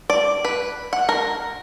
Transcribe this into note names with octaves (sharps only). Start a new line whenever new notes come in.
D5
B4
F#5
A#4